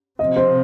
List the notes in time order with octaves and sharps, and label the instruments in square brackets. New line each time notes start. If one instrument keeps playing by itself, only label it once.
[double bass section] C3 F3 C4 [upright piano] D#5
[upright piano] C5